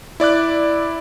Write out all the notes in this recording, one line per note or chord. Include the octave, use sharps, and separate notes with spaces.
E4 D5 D6 F#6